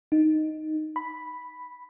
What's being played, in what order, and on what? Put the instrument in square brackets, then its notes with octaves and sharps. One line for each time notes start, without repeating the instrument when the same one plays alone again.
[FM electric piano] D#4
B5